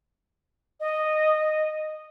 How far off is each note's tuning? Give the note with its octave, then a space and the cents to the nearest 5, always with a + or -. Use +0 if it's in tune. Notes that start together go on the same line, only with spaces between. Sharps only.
D#5 -10